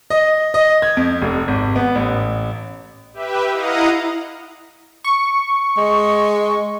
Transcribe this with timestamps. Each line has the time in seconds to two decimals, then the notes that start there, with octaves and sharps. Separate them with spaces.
0.10 D#5
0.54 D#5
0.82 G#6
0.97 F2
1.22 F1
1.48 G#1
1.76 B3
1.95 A1
3.13 G4 B4 E5
3.51 E4 D#5 F5 F#5 A#5 D#6
5.04 C#6
5.78 G#3